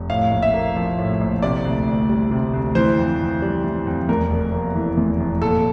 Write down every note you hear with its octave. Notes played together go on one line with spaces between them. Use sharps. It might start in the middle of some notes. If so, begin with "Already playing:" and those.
Already playing: F1
A2 F5
A#1
E5
A#3
F3
A2
A#1
C3 D5
D2
D2
G3
C3
D2
E3 C5
F2
F2
G3
E3
F2
E2 A#4
F1
A#3
E3
E2
F1
A#2 A4